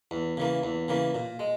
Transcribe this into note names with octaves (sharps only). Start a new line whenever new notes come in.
E2
C#3 E3 A#3
E2
C#3 E3 A#3
A#2
G#3